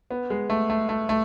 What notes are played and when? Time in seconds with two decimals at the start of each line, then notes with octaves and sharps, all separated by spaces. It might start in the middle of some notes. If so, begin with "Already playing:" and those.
0.11 B3
0.30 G#3
0.50 A3
0.70 A3
0.89 A3
1.09 A3